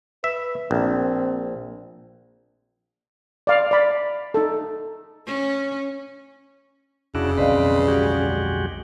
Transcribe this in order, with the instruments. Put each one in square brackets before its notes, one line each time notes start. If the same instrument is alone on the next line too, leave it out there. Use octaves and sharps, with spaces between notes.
[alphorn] B4 [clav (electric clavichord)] E5
[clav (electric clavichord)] A#1 [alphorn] C4
[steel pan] D5 F5
D5 B5
D#4 A4
[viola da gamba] C#4
[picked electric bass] F1 [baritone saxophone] C#3 [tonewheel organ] D4 E4 F#4
[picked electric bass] B1 F2 [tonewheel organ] C4 B4 [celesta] D5 D#5 F5
[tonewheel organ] G#3 F#4 G4